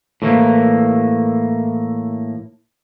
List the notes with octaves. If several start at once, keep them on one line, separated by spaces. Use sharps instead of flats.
A2 E3 A#3